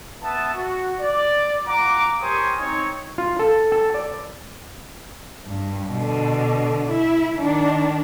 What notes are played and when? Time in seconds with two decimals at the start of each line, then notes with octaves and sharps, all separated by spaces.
0.22 B3 E5 A5
0.53 F#4
1.00 D5
1.66 F4 F#5 A#5 D6
2.21 G4 A#4 C5 C#5 G#5 D#6
2.58 C4 D#4 C#5
3.18 F4
3.39 A4
3.72 A4
3.94 D5
5.47 G2
5.93 B2 D3
6.90 E4
7.37 D#3 D4